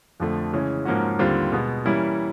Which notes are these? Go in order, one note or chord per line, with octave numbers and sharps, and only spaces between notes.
F2 D3 F3 A3
C#3 E3 G#3 C#4
G#2 F3 A#3 C#4 F#4
D#2 D3 G3 C4 F4
B2 G#3 B3
E3 G3 A#3 C#4 E4